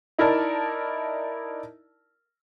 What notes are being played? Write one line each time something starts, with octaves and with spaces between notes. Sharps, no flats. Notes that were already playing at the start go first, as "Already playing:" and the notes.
D#4 E4 A#4 D5 A5